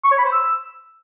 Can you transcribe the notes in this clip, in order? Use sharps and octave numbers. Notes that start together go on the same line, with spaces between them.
C#6
C#5
B5
C5
E6